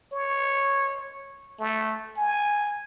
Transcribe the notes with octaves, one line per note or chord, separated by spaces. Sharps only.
C#5
A3
G#5